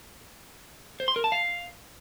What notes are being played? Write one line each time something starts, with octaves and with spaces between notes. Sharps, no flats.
C5
C6
A#4
A5
F5